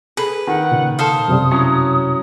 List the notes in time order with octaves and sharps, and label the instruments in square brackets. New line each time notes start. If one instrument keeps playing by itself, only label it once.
[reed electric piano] G#4 A4 B5 [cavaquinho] B4
[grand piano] D#3 [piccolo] F#5
[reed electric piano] A#2 C#3
[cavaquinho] A4 C5 F5 [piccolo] D#6
[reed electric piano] F#2 C3 G3
[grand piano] F#3 C#4 E4